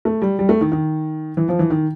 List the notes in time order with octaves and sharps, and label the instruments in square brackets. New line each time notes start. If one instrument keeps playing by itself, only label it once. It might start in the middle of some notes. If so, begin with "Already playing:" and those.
[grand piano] A3
G3
G3
A3
D#3
D#3
E3
F3
E3
D#3